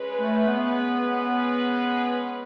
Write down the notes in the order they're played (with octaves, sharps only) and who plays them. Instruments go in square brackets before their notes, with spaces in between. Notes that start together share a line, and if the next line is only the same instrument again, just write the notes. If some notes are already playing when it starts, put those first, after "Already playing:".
Already playing: [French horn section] G#3 C#4 G#4 B4
[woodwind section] A3
B3